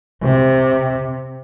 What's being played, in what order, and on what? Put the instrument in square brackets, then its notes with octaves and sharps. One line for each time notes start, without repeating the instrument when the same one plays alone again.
[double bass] C3